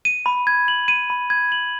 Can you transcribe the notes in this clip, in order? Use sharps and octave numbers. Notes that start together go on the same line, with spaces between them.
D#7
B5
G#6
F#7
D#7
B5
G#6
F#7